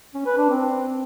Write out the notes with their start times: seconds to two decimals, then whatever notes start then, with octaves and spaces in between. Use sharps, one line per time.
0.14 C#4
0.26 B4
0.38 D4
0.49 C4